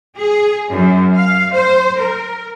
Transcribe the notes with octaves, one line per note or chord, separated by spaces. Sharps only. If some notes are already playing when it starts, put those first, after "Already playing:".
G#4
F#2
F5
C5
A#4